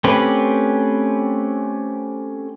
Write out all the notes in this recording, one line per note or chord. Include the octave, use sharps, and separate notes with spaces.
A3 C4 C#4 G4 B4